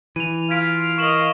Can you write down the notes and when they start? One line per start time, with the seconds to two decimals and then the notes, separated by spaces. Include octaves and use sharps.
0.16 E3 D#7 F7
0.50 F4 F5 G#6 B6 D7
0.98 A#4 D#5 C#6 E7 F#7